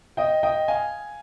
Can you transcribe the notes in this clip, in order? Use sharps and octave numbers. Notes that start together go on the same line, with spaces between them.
D#5 G5
D#5 G5
F5 G#5